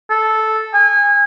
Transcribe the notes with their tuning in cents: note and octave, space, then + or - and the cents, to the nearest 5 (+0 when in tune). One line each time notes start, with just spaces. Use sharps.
A4 -10
G#5 -30